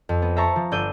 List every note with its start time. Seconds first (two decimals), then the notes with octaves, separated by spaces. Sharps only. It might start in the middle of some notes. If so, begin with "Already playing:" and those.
0.09 F2
0.22 B3
0.36 C5 E5 A5 A#5 C#6
0.56 F3
0.72 G1 D5 E6 G6 D#7